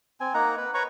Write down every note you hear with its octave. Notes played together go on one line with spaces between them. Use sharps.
C4 G#5
A#3 D#4 F#5 A#5
B4
B4 C#5 A#5 C#6